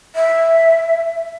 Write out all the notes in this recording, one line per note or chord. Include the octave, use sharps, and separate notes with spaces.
E5